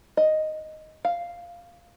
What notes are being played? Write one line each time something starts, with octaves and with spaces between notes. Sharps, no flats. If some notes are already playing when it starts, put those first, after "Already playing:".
D#5
F5